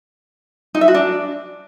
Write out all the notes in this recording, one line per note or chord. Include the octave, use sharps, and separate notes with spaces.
D#4
E5
F#4
D4